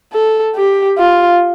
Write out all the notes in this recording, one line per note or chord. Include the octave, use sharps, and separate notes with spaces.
A4
G4
F4